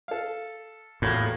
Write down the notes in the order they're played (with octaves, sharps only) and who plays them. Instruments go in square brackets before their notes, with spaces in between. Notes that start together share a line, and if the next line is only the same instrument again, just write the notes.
[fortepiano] A4 F5
[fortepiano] E2 F#3 A#3 [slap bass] A2